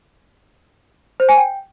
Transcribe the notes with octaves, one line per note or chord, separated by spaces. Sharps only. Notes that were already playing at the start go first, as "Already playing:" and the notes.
C5
G#5
G5